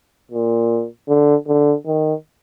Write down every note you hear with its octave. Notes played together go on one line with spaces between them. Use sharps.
A#2
D3
D3
D#3